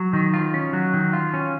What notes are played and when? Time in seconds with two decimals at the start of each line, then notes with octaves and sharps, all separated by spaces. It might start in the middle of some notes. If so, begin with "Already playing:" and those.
Already playing: F#3
0.13 D#3
0.34 F4
0.54 C#4
0.73 F#3
0.94 D#3
1.13 F4
1.34 C#4